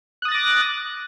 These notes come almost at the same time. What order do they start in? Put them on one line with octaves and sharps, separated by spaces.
F#6 D#6 A6 A#6 D6